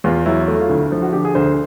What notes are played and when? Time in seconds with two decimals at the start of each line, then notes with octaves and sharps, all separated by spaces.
0.04 E2 F4
0.26 F#3 E4
0.48 A3 E4
0.60 F4
0.69 D2 E4
0.92 F3
1.02 F#4
1.13 D3 G4
1.25 G#4
1.35 D2 C5